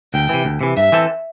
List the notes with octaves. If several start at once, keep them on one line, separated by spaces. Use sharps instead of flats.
D2 G5
C3 E3
D2
C3 E3
G2 E5
E3 C4 A4